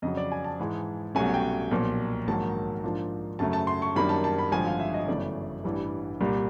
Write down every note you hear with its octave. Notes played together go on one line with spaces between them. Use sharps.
F2 C#3 F#3 D#5
D5
G#5
A5
G#2 E3 G#3
C2 B2 F#3 A3 C#4 G#5
G5
B1 A#2 F3
A#1 G#2 D#3 F#3 A#3 A5
G#2 F3 A#3 D4 F4
F#2 C#3 F#3 A3 A5
A5
C6
C#6
F#2 D#3 G3 A#3 D4 B5
A5
A5
B5
G#1 G2 D3 F3 G#5
F5
E5
D#5
G1 F#2 C#3 E3 A3 D5
A1 G2 E3 G3
C2 A#2 G3